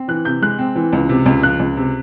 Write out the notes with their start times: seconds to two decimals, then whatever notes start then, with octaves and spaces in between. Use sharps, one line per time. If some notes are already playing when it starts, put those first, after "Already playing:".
Already playing: C4
0.08 E3 F#6
0.25 C3 G6
0.42 G#3 F#6
0.58 C4
0.75 E3
0.93 C#2
1.09 C3
1.26 C#2
1.43 F3 F#6
1.59 C#2
1.77 C3